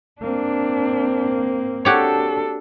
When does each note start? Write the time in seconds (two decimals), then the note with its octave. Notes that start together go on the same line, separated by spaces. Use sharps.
0.21 A#3 C4 D4
1.85 D4 F#4 G4 A4 C#5